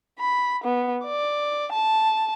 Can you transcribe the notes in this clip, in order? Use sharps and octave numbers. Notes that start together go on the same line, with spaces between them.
B5
B3
D5
A5